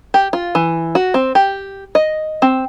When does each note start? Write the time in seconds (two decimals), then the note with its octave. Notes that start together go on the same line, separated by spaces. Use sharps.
0.14 G4
0.33 F4
0.55 E3
0.95 F#4
1.14 C4
1.35 G4
1.95 D#5
2.42 C4